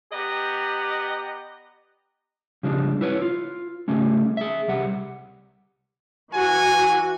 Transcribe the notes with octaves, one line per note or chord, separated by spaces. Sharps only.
B3 G4 D5 D#5 F#5 A#5
C#3 F3 G3 G#3 D4
E4 B4 C#5
F4
C#3 G3 A3 C#4
G#4 E5
C2 G3 F#5
E3 F#4 G#5